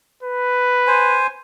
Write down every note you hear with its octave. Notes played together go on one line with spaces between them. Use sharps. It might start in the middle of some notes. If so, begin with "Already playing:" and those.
B4
C5 G#5